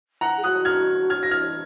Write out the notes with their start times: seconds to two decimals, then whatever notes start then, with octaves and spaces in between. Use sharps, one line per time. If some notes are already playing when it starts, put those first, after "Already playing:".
0.21 F#5 A#5
0.37 G#4
0.44 F#4 D#6 F#6
0.65 F6 G#6
1.10 F6 G#6
1.23 A#6
1.31 F6 G#6